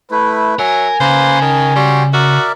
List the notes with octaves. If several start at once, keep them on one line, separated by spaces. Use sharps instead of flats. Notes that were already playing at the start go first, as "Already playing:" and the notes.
A3 E4 B4
F#3 A#4 E5 G#5
C#3 A#3 B4 C5
D#3 A5
G3 F#4 G5 C6
F#4 A#4 D5 E5